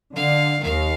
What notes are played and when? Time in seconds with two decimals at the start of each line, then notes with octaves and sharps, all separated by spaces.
0.15 D3 F5
0.63 D#2 D#3 F5